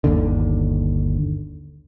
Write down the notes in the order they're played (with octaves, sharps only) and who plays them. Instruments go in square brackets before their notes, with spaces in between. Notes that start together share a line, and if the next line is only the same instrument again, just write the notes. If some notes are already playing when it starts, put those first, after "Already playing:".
[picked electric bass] G1 D#2 D3